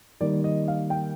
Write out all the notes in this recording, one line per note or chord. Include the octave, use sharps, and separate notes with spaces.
D#3 G3 A#3 D#4 D5
D#5
F5
G5